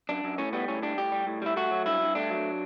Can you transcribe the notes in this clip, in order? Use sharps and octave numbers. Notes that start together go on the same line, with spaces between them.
F#2 D4
F#2
A2 C#4
G3 B3
A2 C#4
G3 D4
A2 G4
G3
A2
G3 E4
A3 F#4
F#3
G2 E4
G2
A3 D4
F#3